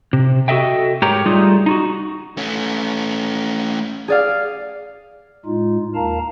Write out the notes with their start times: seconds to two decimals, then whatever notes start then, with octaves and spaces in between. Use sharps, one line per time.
0.13 C3
0.48 F#4 G4 A4 D#5 E5 G5
1.02 G#2 G4 A#4 C#5 A#5
1.26 G3 A3 D#4 F4 G#4
1.66 D#4 F4 F#4
2.37 A3 C#4
4.08 G#4 D5 F5
5.45 A2 G#3 D#4 F4
5.95 D#2 A#4 F5 A5 A#5